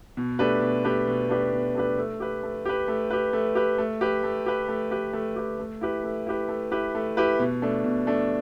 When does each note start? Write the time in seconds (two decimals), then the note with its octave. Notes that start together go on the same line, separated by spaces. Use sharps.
0.17 B2
0.39 A3 D4 G4 B4
0.62 B2
0.85 A3 D4 G4 B4
1.07 B2
1.29 A3 D4 G4 B4
1.53 B2
1.75 A3 D4 G4 B4
1.98 A3
2.20 G4 B4
2.43 A3
2.65 G4 B4
2.88 A3
3.11 G4 B4
3.33 A3
3.55 G4 B4
3.78 A3
4.01 G4 B4
4.23 A3
4.46 G4 B4
4.68 A3
4.91 G4 B4
5.13 A3
5.36 G4 B4
5.59 A3
5.81 E4 G4 B4
6.04 A3
6.27 E4 G4 B4
6.49 A3
6.71 E4 G4 B4
6.95 A3
7.17 E4 G4 B4
7.39 B2
7.62 A3 D4
7.84 B2
8.07 A3 D4